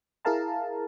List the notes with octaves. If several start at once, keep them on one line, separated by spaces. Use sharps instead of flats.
E4 G#4 A#4 F5 A5 A#5